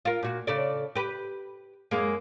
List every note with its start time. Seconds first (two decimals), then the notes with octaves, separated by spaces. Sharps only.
0.05 F4 A#4
0.23 A#2 F#4
0.47 C#3 A4 D5
0.95 G4 B4
1.91 F#2 G#3 A#3